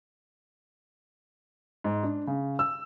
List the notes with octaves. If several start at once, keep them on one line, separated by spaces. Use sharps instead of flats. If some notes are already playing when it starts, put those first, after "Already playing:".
G#2
D4
C#3
E6